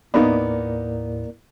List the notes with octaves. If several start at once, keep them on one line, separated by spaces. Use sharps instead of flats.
D#2 A2 A#3 B3 D#4 A#4 D5